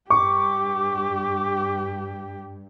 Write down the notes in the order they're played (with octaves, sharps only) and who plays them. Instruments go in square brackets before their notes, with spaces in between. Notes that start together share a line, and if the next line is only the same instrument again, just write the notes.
[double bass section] G2 [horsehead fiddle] G4 [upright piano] C#6 [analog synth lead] D6